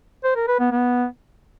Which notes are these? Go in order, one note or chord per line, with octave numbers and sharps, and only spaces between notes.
C5
A#4
B4
B3
B3